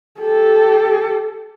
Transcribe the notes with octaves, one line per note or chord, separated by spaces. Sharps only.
G4 A4